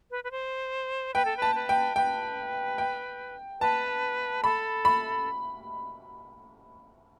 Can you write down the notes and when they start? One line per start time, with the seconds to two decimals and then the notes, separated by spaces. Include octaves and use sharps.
0.11 B4
0.24 B4
0.31 C5
1.14 B4 G5
1.25 A4
1.37 B4
1.42 A5
1.55 B4
1.69 G5
1.96 B4 G5
2.78 G5
3.61 B4 A5
4.44 A4 B5
4.85 B5